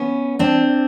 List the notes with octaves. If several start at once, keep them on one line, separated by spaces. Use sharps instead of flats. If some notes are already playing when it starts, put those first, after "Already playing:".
Already playing: B3 C#4
C4 D4